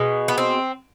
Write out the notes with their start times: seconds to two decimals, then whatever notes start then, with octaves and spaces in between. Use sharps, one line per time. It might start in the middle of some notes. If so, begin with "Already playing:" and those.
Already playing: B2 G#3
0.28 B3
0.38 C4